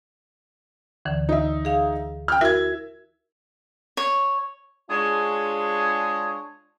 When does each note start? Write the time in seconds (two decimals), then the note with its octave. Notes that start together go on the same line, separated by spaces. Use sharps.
1.05 D2 D3 E3
1.29 D#4 E5
1.65 G#4 F5
2.28 G5 F6
2.41 E4 F#4 A#4 E5 G#6
3.97 C#5
4.90 G#3 D4 F4 G#4 C#5